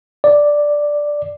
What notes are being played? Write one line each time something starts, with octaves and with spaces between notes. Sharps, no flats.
D5